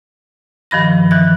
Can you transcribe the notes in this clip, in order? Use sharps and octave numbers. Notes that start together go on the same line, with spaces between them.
G2 D#3 F3 B5 A#6
E3 F#6